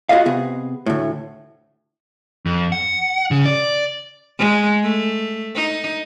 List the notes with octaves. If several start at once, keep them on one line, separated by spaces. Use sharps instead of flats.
F4 F#4 G#4 A#4 D#5 F5
C3 B3 G#4
D2 A2
F2
F#5
C#3
D5
G#3
A3
D#4